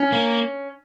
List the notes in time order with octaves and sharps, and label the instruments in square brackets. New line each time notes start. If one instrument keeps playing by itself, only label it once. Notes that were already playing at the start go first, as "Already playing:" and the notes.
Already playing: [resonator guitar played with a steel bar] C#4
[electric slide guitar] A#3